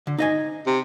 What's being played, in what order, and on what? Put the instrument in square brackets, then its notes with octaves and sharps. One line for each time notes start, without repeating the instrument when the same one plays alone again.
[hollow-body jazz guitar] D3
D#4 D#5 G#5
[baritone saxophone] C3